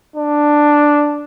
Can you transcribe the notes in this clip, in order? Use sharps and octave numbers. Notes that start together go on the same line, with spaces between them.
D4